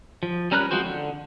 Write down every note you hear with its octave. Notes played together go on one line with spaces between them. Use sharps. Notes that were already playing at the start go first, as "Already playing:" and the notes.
F3
G3 C#4 A#4 B4 F#6
F3 G#3 C4 F#4 C5
D3